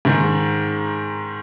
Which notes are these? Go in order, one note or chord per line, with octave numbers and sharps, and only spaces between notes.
G#2 D#3 G#3